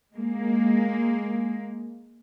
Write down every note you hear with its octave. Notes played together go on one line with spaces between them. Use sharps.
G#3 A#3